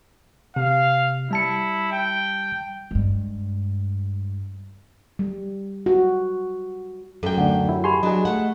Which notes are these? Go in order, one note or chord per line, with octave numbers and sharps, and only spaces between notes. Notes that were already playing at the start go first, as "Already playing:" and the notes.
C3 F5
G3 E4 A5 C#7
G5
G2 G#3
G3
F#4
F#2 A4 G5
D2 D4 F#5
F#3 E4
G4 G#5 A5 B5 C6
F#3 D4 G#4 D#5
A3 F#5